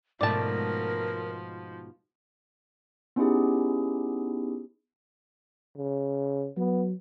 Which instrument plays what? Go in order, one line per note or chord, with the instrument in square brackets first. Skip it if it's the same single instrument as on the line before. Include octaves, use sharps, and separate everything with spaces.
[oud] G#2 B2 A3 [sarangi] F3 [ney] A#4 [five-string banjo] D5 A5
[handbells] B3 C#4 D#4 E4 G4 G#4
[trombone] C#3
[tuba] F#3 [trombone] B3